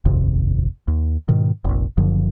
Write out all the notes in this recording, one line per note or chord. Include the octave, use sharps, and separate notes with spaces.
D#1 G#1 F2 C3
D#2
G#2 B2 D#3
F1 A#1
F#1 F#2 D3 F3